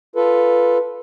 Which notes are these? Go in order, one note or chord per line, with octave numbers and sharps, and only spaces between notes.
F4 A4 B4